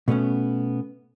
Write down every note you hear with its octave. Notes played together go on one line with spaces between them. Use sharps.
B2 A3 B3 C#4